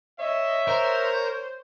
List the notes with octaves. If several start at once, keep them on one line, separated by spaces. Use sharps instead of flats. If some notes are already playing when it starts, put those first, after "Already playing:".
C#5 D#5 E5
A#4 C5